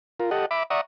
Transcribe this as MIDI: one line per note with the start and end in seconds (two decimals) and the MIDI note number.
0.20 0.30 65
0.20 0.30 70
0.31 0.46 67
0.31 0.46 69
0.31 0.46 75
0.31 0.46 78
0.51 0.63 76
0.51 0.63 83
0.51 0.63 86
0.70 0.81 74
0.70 0.81 76
0.70 0.81 78
0.70 0.81 82
0.70 0.81 85
0.70 0.81 87